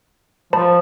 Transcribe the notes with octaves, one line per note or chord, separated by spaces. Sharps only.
F3 C5 A5 B5